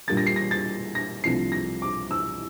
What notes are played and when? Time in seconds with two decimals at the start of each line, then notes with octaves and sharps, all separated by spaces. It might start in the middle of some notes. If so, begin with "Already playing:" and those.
0.08 A#2 G3 A#3 D4 A6
0.17 A#6
0.27 C7
0.36 A#6
0.51 A6
0.95 A#6
1.23 C2 C3 F3 A3 D4 C7
1.52 A#6
1.82 D6
2.11 E6